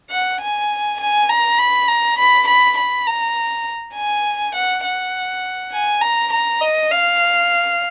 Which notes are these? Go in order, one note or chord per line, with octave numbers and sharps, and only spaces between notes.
F#5
G#5
G#5
A#5
B5
A#5
B5
B5
B5
A#5
G#5
F#5
F#5
G#5
A#5
A#5
D#5
F5